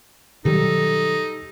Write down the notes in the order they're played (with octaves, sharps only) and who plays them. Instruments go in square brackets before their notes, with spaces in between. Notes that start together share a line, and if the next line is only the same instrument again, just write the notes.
[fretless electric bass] B2 D#3 F#3 [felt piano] G3 [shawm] D#4 [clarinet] A4